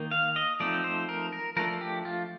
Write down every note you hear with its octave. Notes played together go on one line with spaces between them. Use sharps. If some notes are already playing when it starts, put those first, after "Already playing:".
Already playing: D#3 A#3 D#4
F5
D#5
F3 A3 C4 D#4 D5
C5
A#4
A#4
F3 A3 D4 A#4
G4
F4